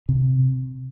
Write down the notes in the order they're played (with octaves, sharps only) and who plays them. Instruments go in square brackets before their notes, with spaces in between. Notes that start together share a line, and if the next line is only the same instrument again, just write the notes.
[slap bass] C3